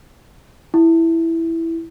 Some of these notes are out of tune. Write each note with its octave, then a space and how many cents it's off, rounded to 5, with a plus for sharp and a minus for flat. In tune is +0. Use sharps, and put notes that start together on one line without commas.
E4 +0